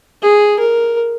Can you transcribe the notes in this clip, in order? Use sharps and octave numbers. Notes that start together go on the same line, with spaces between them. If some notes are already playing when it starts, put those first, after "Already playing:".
G#4
A#4